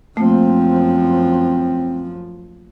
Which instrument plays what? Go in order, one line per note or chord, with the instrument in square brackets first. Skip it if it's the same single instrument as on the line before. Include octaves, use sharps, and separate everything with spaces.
[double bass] F#2 F3 [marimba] A3 A#3 [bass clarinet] C4